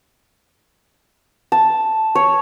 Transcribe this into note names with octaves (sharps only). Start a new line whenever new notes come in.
A5
C#5